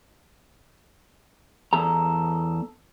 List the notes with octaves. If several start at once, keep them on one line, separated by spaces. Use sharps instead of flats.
E2 A4 A#5